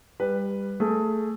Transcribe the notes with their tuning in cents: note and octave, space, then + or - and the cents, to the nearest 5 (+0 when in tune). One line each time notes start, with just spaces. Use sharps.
G3 +20 B4 +0
A3 +10 G#4 +20